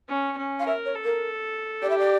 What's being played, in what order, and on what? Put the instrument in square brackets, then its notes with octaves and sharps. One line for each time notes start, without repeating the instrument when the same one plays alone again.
[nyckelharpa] C#4
C#4
[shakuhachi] F5
[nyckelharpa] A#4 [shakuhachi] E5
[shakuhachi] C#5
[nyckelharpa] A4
[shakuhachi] A#4
[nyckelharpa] G4 [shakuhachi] D5
[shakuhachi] E5
D5